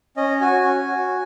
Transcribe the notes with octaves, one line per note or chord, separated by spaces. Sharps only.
C#4 D#5
F#4 G#5
C#4
F#4